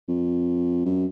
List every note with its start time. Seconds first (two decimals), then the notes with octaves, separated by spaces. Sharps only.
0.09 F2
0.85 F#2